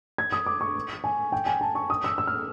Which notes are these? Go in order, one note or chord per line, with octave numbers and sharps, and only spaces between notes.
G#6
D#6
D6
C#6
G#5
G5
G#5
A5
C#6
D#6
E6
E6
F6